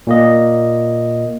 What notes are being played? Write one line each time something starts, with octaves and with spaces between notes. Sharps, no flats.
A#2 A#3 D#5